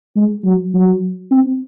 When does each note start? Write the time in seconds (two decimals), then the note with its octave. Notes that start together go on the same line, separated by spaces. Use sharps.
0.16 G#3
0.45 F#3
0.74 F#3
1.31 C4